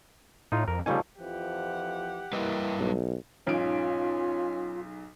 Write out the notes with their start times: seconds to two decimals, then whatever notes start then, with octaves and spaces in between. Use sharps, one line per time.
0.52 A2 D#4 F4
0.68 F2 A#4
0.86 C#3 F3 G3 A3 D#4 G#5
1.20 F2 E3 F3 G4 F#5
2.33 G3 A#3 E4 B4 D#5
2.79 B1
3.47 B1 G#2 C#4 F4 D7